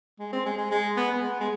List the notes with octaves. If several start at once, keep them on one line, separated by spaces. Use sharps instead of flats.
G#3
C4
G#3
G#3
G#3
B3
G#3
B3
G#3